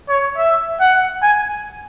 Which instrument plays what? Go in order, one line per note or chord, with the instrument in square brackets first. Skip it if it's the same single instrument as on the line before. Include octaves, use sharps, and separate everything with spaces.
[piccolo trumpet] C#5
E5
F#5
G#5